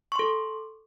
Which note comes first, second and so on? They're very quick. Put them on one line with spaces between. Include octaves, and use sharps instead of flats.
C#6 C6 A4